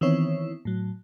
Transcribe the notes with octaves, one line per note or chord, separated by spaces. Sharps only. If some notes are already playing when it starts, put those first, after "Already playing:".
D#3 E3 B3 C4 E4 C#5
A2 F#3